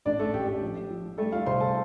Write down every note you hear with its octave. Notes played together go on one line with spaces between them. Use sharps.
A1 D4 D5
A3 A4
A1 G4
G4
F3
F3
G3 A3 A4
F4 F5
C2 C5 C6
A4 A5